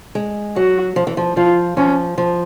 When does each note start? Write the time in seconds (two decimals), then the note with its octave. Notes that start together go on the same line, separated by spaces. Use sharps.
0.15 G#3
0.56 F#3 F#4
0.96 F3
1.07 E3
1.17 F3
1.36 F3 F4
1.77 F3 C#4
2.18 F3